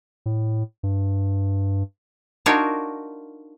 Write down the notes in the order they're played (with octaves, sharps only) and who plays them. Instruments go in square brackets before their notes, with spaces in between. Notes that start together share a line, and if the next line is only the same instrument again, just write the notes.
[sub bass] A2
G2
[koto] D4 D#4 F4 F#4 A#4 C#5